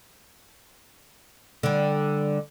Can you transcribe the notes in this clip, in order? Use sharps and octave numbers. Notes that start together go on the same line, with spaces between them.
D3 G3